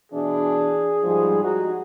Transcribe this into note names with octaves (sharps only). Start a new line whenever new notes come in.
B2 E3 D4 G#4
G#2 F3 G3
D#4 F#4